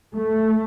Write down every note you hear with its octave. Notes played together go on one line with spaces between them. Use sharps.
A3